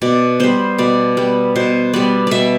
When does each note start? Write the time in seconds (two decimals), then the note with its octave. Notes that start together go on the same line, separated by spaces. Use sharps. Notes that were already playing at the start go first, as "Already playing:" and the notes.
0.02 B2 D5
0.40 G3 B3 C5
0.78 B2 D5
1.17 G3 B3
1.56 B2 C5
1.93 G3 B3 D5
2.27 B2 D5 E5